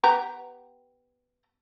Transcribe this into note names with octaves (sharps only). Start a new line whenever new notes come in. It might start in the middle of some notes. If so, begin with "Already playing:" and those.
B3 G4 A#5